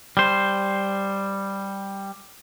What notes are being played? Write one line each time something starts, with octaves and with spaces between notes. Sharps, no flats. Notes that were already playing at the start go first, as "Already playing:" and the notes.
G3 C5